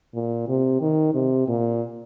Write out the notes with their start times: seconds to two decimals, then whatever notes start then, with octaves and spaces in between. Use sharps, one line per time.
0.15 A#2
0.49 C3
0.81 D#3
1.15 C3
1.48 A#2